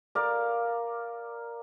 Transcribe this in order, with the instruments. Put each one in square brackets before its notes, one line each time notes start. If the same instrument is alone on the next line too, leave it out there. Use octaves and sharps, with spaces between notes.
[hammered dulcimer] A#4 D5 F5